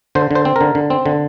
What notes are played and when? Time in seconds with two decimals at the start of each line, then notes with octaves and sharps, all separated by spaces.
0.15 D3 C5
0.31 D3 C5
0.45 C4
0.56 D3 A#4
0.75 D3
0.90 C4
1.06 D3